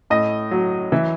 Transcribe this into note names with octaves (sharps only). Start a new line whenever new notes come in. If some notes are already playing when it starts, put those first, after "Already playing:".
A2 D#5
F#3
E3 E5